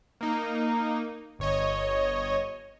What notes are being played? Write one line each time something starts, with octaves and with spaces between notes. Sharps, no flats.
A#3 D#4
G1 C#5 D#5